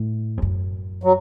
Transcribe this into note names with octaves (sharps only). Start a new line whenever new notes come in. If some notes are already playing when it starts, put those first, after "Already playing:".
Already playing: A2
F2
F#2
F#3